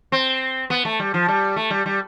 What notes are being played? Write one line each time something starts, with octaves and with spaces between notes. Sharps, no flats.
C4
B3
A3
G3
F3
G3
A3
G3
G3